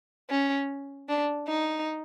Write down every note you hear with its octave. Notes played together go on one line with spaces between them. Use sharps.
C#4
D4
D#4